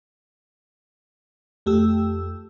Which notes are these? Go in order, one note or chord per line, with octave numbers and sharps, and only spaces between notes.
F2 A3 G4 E6